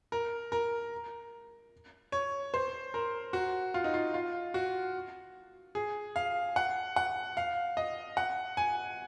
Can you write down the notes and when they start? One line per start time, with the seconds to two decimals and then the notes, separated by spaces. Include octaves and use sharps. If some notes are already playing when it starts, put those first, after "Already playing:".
0.12 A#4
0.52 A#4
2.12 C#5
2.54 C5
2.94 A#4
3.33 F#4
3.74 F4
3.84 D#4
3.94 F4
4.14 F4
4.54 F#4
5.75 G#4
6.16 F5
6.56 F#5
6.96 F#5
7.37 F5
7.77 D#5
8.17 F#5
8.57 G#5